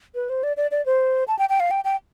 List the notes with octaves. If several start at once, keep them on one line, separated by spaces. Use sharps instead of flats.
B4
C5
D5
D5
D5
C5
A5
G5
G5
F5
G5
G5